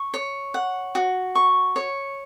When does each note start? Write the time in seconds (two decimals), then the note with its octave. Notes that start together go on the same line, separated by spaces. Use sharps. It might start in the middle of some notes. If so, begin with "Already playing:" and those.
Already playing: C#6
0.14 C#5
0.54 F#5
0.95 F#4
1.35 C#6
1.76 C#5